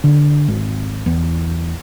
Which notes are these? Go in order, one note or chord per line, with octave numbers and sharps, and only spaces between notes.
D3
G#1
E2